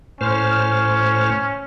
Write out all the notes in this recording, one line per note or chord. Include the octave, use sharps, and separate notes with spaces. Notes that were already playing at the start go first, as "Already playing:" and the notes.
A2 C#4 C5 F6